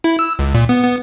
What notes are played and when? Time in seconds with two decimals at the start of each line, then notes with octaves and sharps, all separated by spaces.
0.04 E4
0.19 E6
0.39 C#2
0.54 A#2
0.69 B3
0.85 B3